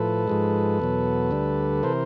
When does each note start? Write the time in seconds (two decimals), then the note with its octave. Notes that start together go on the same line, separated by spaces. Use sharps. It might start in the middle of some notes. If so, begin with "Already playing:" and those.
Already playing: A2 F3 A4 B4
0.28 G#2 F3 G#3
0.79 E2 B2 F#3
1.31 D2 D3 G3
1.83 C3 E3 A#4 C5